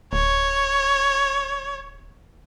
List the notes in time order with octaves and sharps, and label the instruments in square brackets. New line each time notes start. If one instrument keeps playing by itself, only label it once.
[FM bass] D1 [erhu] C#5